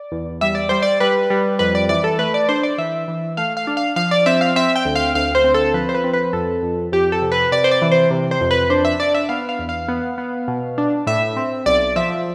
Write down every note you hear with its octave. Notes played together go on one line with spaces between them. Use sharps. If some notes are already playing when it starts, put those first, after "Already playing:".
Already playing: D5
E2
G3 E5
D5
G3 C5
D5
G3 B4
G3
F2 B4
D5
E3 D5
A4
A3 B4
D5
D4 C5
D5
E3 E5
E3
A3 F5
F5
D4
F5
F3 F5
D5
C4 E5
F5
C4 E5
G5
D2
F5
D2 F5
C5
C4
A4
F3 B4
C5
B4
C4
B4
F2 A4
F2
F2 G4
A4
C3
B4
C3 D5
C5
D5
E3
C5
C3
C5
F2
B4
D4 C5
E5
D4 D5
E5
B3 F5
F5
E2
F5
B3
B3
B2
D4
A2 E5
C4
B1 D5
F3 E5